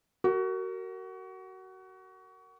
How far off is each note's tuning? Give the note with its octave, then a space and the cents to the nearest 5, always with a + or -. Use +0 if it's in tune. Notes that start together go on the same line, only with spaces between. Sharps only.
F#4 +25 A#4 -20